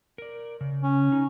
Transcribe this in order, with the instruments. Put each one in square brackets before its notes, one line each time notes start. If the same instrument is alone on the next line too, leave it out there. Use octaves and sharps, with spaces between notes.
[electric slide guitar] A#4 D5
C#3
[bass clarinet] C#4
[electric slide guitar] D#4